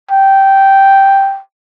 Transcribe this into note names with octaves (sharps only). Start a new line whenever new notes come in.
G5